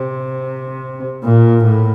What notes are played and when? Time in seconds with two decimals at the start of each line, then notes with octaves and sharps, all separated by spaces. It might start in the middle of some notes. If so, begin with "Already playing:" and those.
Already playing: C3
1.24 A#2
1.63 A2